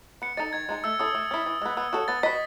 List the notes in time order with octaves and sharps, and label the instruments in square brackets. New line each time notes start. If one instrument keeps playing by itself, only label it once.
[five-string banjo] B3 [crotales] C#7
[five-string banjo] D#4 A4 D#5 [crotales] A6
[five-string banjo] D#3 [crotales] G#6
[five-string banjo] G#3 D#4 G#4
[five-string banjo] A3 [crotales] E6
[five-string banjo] C#4 E4 A4 [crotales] D#6
[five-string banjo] A3
C#4 E4
E3
G#3 B3
[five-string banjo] B3 [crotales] E6
[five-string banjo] F#4 A4 C#5
[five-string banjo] B3 [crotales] A6
[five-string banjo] F#4 B4 D#5 [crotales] B6